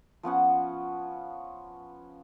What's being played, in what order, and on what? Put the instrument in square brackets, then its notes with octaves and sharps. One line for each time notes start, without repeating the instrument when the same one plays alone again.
[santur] F3 B3 C#4 F#5